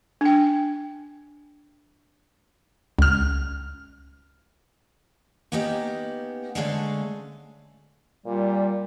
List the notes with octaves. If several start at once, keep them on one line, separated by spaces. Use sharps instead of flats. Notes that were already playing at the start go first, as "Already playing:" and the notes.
D4 G5
C#2 F6
A#3 B3 C#4 D#4 G4
D3 G#3 A3 C#4 D4 F5
A#2 G3